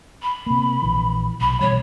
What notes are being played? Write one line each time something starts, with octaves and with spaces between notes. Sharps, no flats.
B5
C3 A#3
A#1 E3
B1 B5
B2 E3 G3 C#5